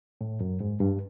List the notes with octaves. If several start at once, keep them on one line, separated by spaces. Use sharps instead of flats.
A2
F#2
G#2
G2